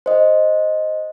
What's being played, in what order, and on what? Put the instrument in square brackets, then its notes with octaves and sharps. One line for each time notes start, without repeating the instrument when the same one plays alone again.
[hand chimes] C5 D#5